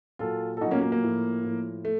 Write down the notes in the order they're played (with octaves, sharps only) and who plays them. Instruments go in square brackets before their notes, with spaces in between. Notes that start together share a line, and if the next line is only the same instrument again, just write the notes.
[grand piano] A#2 F#3 F4 A4
A4
A#2 F#3 D#4 F#4
A#3 C#4
A#3
A#3
A2 F3
A2 F3
A3